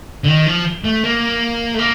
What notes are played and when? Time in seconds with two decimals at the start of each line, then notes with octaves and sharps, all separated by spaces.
0.24 D3
0.28 D#3
0.46 F3
0.84 A3
1.04 A#3
1.74 A3
1.79 A#3